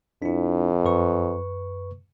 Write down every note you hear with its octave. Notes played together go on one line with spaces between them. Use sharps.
F2 D4 E4
F#2 B4 C#6